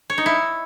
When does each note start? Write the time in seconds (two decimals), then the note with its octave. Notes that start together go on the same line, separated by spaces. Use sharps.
0.10 C#5
0.18 D#4
0.26 E4